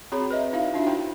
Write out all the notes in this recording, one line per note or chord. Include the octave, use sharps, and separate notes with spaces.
C4 F#4 G#4 C#5 A#5 B5
B4 C#5 D#5 E5
D#4 E4 E5 F5
D4 F4 F#4 E5
D#4 E4 F#4 C5 G5